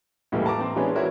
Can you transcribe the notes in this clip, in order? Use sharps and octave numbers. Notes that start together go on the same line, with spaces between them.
C#2 A2 E3 G3 A#3
A5 A#5 D6
C4
E3 G#3 B3 C#4 D4
E4 F#4 A#4 C#5